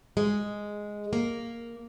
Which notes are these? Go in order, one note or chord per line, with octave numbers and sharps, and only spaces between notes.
G#3
A#3